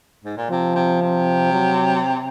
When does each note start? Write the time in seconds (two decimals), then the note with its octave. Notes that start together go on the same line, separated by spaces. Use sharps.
0.24 G#2
0.37 A#2
0.50 C3 F3
0.75 C3
1.01 C3
1.53 F#3